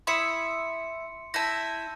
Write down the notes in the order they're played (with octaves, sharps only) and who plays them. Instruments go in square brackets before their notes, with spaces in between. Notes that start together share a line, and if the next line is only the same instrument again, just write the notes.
[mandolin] E4 E5 D#6 [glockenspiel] C6 C#7
[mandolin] E4 E5 [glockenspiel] A5 G6 A#6